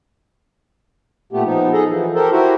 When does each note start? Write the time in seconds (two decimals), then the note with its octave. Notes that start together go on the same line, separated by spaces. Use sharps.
1.33 A#2 A3 B3 G4
1.45 F3 B3 D#4
1.73 D#4 G#4 A4 D#5
1.89 E3 F3
2.15 G4 A4 A#4 C5
2.31 E4 F#4 G4 A#4 C5